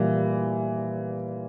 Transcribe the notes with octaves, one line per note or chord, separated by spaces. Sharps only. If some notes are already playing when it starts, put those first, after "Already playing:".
Already playing: A#2 E3 G3 A#3